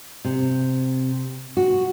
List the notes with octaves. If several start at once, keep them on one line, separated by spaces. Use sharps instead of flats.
C3
F#4